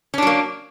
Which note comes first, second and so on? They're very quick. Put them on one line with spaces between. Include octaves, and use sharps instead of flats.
C#4 D4 F#3 A#3